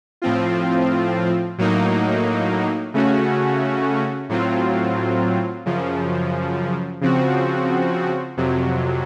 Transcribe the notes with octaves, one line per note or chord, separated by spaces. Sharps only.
A2 F3 C4 F4
A2 F#3 A#3 D#4
C#3 A3 C#4 F#4
A2 F#3 C4 F4
F#2 C#3 F3
C#3 F3 C4 F#4
F2 C3 F#3